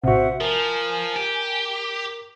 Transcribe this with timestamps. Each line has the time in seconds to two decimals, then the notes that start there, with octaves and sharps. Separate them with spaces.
0.04 A#1 A2 C3 C4 F#4 C5 E5 F#5
0.40 F3 A#4 G#5
1.16 G4